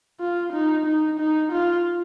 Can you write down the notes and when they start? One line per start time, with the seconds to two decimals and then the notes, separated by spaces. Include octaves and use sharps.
0.20 F4
0.52 D#4
0.86 D#4
1.19 D#4
1.52 F4